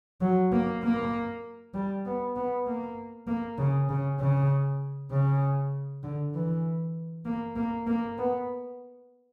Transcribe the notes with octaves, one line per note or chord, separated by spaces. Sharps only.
F#3
A#3
A#3
G3
B3
B3
A#3
A#3
C#3
C#3
C#3
C#3
D3
E3
A#3
A#3
A#3
B3